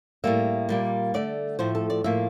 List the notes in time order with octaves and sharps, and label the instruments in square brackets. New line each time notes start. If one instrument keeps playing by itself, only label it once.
[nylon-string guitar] A2 G3 A#3 E5
A#2 G3 A#3
D3 A3 D5
A2 F3 A3 C5
A4
D5
A2 F3 A#3 E5